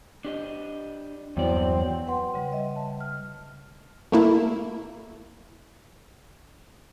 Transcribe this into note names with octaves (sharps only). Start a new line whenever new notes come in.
D4 G4 D#5
E2 G2 E3 F#3 C4 D5
B4 F#5 G5 C6
C#3 G3
D#5 E5
A5
F6
A3 A#3 E4